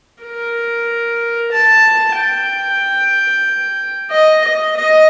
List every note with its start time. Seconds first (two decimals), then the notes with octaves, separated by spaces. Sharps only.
0.23 A#4
1.52 A5
2.16 G5
4.11 D#5
4.44 D#5
4.77 D#5